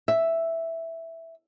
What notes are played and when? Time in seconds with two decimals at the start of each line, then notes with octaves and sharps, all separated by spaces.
0.08 E5